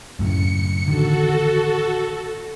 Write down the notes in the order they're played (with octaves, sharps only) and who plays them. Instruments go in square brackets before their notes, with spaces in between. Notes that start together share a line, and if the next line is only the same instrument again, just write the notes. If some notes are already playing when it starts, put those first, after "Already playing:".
[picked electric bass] F#2 A2 C#3 [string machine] C#7
[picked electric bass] A1 D3 D#3 [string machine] F#4 A4